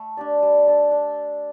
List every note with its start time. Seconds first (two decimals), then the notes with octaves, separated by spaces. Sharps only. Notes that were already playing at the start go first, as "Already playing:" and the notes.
Already playing: A3
0.17 D4 G4 D5
0.43 G3
0.67 D4 A4
0.91 D4